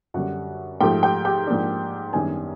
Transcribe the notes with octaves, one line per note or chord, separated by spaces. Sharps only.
F#2 D3 G3 F#4 F#5
G#2 F3 A3 G4 G5
G4 G5
G4 G5
G#2 F3 A#3 D4
F#2 D#3 G3 B3 D4 G#4 G#5